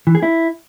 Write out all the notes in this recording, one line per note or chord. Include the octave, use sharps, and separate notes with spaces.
E3
G#4
E4